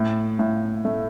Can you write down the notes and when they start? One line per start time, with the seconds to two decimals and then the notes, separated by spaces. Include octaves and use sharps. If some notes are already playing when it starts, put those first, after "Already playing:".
Already playing: A2
0.39 A2
0.85 A3